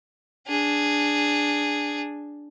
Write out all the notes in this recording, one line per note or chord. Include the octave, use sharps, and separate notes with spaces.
D4 G#4